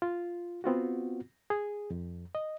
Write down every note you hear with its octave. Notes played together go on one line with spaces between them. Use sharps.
F4
B3 C4 F4 F#4
G#4
F2
D#5